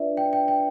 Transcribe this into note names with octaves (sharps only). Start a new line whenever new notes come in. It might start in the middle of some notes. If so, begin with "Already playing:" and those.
Already playing: D4 F4 B4 D5 E5
G5
G5
G5